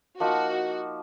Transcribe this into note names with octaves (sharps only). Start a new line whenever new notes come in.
F3 A#3 D#4 F#4